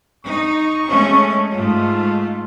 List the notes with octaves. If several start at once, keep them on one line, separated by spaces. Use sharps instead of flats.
D#4 C#6
G#3 A3 C#4
G#2 A3 F4